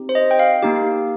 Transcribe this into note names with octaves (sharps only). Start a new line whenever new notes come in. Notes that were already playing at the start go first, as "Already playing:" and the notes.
Already playing: C4 D#4 G4
C5
D#5
G5
F5
A#3 D#4 G4